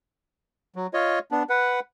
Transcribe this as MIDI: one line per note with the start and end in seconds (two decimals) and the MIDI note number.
0.76 0.87 54
0.94 1.19 65
0.94 1.19 73
0.94 1.19 75
1.32 1.43 59
1.32 1.43 62
1.50 1.80 71
1.50 1.80 78